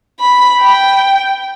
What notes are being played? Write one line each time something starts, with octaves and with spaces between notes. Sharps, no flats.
B5
G5